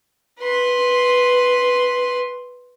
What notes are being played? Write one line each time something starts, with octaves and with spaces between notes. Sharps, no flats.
B4 C6